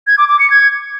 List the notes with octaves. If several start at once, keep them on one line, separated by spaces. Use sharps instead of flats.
G#6
D6
D6
C#7
G#6